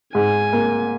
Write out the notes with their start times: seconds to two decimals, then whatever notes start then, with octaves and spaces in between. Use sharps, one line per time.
0.15 G#2 G#5
0.53 A#3